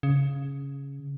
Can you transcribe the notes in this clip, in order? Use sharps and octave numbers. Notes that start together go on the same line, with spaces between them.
C#3